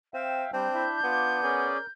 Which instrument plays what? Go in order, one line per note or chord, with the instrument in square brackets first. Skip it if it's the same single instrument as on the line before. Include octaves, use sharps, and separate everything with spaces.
[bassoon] C4 [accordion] E5 F5 G5 [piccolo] E7
[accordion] G3 [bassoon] C4 [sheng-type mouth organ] D4 [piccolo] G6
[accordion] E4 E5
[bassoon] B3 [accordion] F4 D6
[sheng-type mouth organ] C#4 G#4 D5 [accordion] A#4